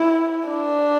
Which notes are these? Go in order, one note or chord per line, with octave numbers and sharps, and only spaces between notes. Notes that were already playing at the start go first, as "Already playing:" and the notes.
Already playing: E4
D4